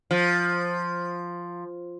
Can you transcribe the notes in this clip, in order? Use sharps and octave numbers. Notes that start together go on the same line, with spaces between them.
F3